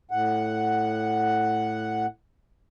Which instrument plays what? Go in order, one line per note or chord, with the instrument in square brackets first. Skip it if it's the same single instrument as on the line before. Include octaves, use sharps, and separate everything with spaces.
[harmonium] A2 F#5